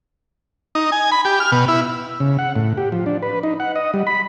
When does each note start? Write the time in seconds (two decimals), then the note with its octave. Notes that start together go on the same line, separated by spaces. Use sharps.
0.75 D#4
0.92 G#5
1.12 B5
1.25 G4
1.40 F6
1.52 B2
1.68 E4
2.20 C#3
2.39 F#5
2.56 A2
2.77 G4
2.92 F3
3.06 D4
3.22 B4
3.43 D#4
3.60 F#5
3.76 D#5
3.94 G3
4.07 B5